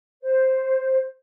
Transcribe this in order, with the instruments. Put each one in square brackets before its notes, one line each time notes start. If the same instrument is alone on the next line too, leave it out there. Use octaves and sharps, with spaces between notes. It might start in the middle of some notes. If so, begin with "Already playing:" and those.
[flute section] C5